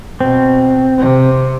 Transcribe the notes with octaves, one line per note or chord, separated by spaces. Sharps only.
B2 C4
C3